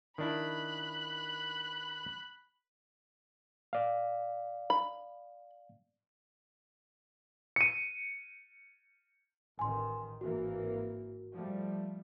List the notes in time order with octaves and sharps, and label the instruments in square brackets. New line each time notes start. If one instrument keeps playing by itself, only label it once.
[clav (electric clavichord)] D#3 D4 E4 [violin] B5 F#6
[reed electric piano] D5 F5
[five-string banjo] B5
[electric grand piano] C#7 D#7
[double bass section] A1 D#3 [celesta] G#5 C6
[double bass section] G#1 E3 A#3 [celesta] F#4
[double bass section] F3 G3 A3